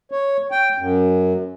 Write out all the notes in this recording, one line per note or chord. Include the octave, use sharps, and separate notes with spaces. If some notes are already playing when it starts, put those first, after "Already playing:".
C#5
G5
F#2